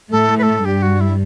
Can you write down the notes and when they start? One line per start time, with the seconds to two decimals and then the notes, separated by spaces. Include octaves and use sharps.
0.11 A2 A3 A4
0.38 B4
0.43 A4
0.65 G2 G3 G4
0.82 F#4
1.00 E4